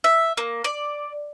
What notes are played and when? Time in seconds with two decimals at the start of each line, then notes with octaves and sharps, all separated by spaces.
0.04 E5
0.37 A#3
0.64 D5